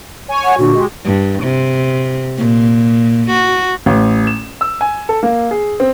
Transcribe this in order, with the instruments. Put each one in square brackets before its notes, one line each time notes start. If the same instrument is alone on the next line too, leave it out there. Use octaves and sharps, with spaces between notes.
[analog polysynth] C#5 G#5
[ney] F#5
[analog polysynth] A#2 D3 [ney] F#4
[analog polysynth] G#3 G4
[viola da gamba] G2
C3
A#2
F#4
[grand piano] A1
E7
E6
G#5
A4
A#3
G#4
C4